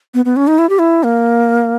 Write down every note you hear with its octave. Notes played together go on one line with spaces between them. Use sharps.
B3
B3
C#4
D#4
E4
G4
E4
A#3